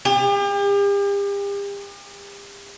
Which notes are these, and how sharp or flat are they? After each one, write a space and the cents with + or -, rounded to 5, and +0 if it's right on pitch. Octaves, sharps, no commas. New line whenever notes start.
G4 +40